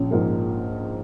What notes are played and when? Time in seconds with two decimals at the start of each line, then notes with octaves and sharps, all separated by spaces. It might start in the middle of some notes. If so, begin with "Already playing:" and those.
Already playing: A#1 C#4
0.11 G#2 F3 A#3